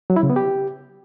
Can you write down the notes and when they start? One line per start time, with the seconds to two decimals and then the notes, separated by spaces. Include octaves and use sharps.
0.10 F#3
0.16 E4
0.23 C#3
0.30 B3
0.36 G4